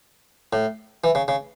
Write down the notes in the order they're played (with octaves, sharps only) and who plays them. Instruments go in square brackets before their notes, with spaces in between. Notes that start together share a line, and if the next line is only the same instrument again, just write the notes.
[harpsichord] A2
E3
C#3
C#3